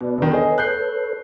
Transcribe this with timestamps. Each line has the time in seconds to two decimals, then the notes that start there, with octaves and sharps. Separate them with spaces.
0.01 B2 B4 D5
0.18 E1 D#3
0.32 G#4 A4 B4 C#5 D#5
0.58 F#6 G6 C7